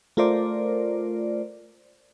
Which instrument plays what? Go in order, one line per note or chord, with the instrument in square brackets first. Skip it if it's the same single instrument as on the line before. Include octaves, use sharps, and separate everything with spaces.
[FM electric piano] A3 F4 A#4 C5 D5